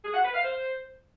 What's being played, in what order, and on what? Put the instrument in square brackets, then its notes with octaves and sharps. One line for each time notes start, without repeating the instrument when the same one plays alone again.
[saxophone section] G#4
F#5
B4
F5
C5